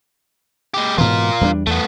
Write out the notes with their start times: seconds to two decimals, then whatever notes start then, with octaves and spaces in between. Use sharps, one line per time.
0.74 G#3 G4
0.98 G#2 B2 E3 F4 A#4
1.41 E2 G3 D4
1.67 E2 A3 B3